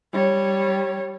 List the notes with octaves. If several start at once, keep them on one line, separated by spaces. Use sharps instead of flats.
G3 C#5